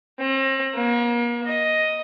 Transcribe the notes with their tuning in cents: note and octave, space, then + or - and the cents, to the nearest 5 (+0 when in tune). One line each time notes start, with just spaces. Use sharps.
C4 +40
A#3 +40
D#5 +5